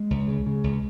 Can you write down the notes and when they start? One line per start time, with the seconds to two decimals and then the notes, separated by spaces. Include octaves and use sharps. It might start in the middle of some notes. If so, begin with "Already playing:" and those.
Already playing: G#3
0.10 C#2
0.28 C#3
0.46 C#3
0.64 C#2